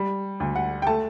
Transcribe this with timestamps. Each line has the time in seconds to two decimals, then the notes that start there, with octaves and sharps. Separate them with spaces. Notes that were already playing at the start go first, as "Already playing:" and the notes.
Already playing: G3
0.40 D2
0.56 F#5
0.82 G5
0.87 A3 A5